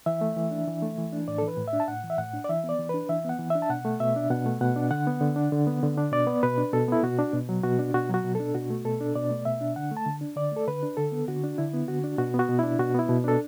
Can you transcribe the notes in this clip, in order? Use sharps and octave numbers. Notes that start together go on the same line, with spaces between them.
E3 E5
A3
E3
D4
E3
A3
E3
D4
A2 D5
E3 A4
B4
A2
E5
D4
A5
A2 F#5
E3
E5
A2 F#5
D4
D5
E3 E5
B3
D5
E3
D4 B4
E3 E5
B3 F#5
E3
D4 E5
A5
B2 F#5
A3
B2 E5
D4
B2 F#5
A3
B2 F#5
D4
D3 F#5
B3
D3
D4
D3
B3
D3
D4
B2 D5
B3
B2 B4
D4
B2 A4
B3 E4
B2 F#4
D4
B2
F#3
B2 F#4
D4
B2 F#4
F#3 F#4
B2
D4 A4
B2 F#4
A3
B2 A4
D4
B2 D5
A3
B2 E5
D4
D3 F#5
A3
A5
D3
D4
D3 D5
A3 A4
D3 B4
D4
D3 A4
B3
D3 F#4
D4
D3 E4
B3
D3 F#4
D4
B2 F#4
B3
F#4
B2
D4 E4
B2 F#4
B3 E4
B2
D4 A4